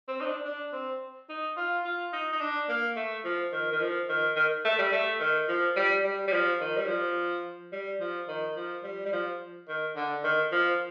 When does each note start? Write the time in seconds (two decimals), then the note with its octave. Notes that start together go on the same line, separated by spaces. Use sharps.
0.08 C4
0.21 D#4
0.26 D4
0.45 D4
0.73 C4
1.29 D#4
1.57 F4
1.85 F4
2.13 D#4
2.33 D#4
2.41 D4
2.69 A#3
2.96 A3
3.25 F3
3.52 D#3
3.72 D#3
3.81 F3
4.09 D#3
4.36 D#3
4.65 A3
4.79 G3
4.93 A3
5.20 D#3
5.48 F3
5.76 G3
6.04 G3
6.28 G3
6.32 F3
6.60 D#3
6.77 G3
6.88 F3
7.73 G3
8.00 F3
8.28 D#3
8.56 F3
8.84 G3
9.05 G3
9.13 F3
9.68 D#3
9.96 D3
10.24 D#3
10.52 F3